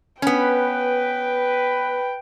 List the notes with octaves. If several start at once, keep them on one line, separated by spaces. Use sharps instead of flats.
B3 C#4 B4 G5